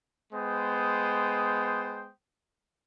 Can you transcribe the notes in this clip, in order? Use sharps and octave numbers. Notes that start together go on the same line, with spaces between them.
G#3 B3 C5 G5 D#6